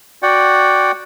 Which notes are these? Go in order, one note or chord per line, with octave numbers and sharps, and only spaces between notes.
F#4 D5 F#5 G5